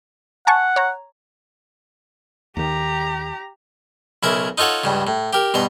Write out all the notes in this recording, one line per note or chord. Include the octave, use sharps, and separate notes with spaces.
F#5 G#5 A5 C#6
C#5 A#5
D#2 D#3 G4 A#5
B1 C#3 E4 A#4 A#5
D#4 F4 A4 C#5 F#5
C#2 G2 C#3
A2
G4 A#4
G2 B2 A#5 C6